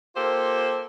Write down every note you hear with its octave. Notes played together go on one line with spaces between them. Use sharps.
A#3 F4 G4 A4 C5